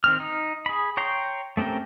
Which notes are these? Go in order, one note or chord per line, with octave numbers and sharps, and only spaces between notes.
D#3 C4 F6
D#4
G#4 B5
C#5 G5 A#5 C6
A3 C4 C#4 G4 A#4